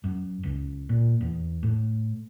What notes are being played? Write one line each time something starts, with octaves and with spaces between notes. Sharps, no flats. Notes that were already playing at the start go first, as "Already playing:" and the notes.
F#2
C#2
A#2
E2
A2